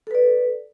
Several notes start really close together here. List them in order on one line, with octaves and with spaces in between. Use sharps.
A4 B4 D5